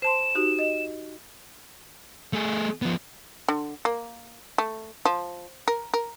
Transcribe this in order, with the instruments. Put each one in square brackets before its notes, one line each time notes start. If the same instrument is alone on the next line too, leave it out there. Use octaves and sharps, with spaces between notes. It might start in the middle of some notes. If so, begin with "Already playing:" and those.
[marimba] C5 A5 C6 [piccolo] E7
[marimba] D#4 F#4 G4
D#5
[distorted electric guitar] A3 G#4
F3 B3
[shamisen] D3
A#3
A3
F3
A#4
A#4